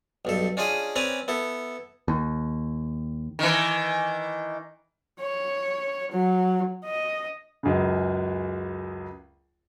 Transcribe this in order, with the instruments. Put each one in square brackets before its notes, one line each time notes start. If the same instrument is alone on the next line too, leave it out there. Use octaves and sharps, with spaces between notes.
[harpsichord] B1 G2 A4
C#4 D4 F4 G#4 D#5
C4 C#4 B4 D5 G#5 A#5
B3 E4 A4
[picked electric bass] D#2
[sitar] D#3 E3
[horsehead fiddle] C#5
F#3
D#5
[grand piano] C#2 F#2 C#3